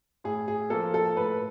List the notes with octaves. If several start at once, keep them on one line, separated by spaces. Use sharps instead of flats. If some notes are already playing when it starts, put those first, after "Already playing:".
A2 G#4
G#4
F3 A#3 A4
A4
A2 B4